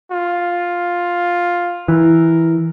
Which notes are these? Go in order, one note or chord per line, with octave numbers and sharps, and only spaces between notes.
F4
E3 A#4